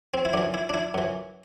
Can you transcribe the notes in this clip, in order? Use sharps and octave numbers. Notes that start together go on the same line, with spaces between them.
C4
E4
F#2 E3 D4
E4
D4
E4
F#2 E3